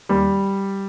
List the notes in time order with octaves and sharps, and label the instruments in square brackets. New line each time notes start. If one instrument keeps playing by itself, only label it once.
[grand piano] D#2 G3